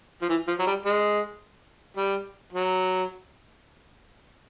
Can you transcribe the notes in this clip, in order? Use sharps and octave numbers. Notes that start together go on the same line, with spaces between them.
F3
E3
F3
F#3
G3
G#3
G3
F#3